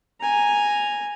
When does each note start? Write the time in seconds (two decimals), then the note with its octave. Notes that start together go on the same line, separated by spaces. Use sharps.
0.20 G#5 A#5